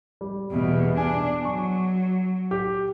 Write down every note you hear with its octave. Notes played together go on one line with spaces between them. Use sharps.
G3
E2 B2
D4 G#5
F#3 C#6
G4